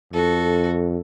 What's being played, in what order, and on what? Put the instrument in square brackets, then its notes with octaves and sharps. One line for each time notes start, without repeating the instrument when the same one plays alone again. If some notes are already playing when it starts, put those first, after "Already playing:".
[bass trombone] F2 [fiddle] F#4 A4